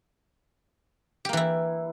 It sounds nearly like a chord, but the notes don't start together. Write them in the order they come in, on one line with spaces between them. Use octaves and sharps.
G4 A#3 E3 E4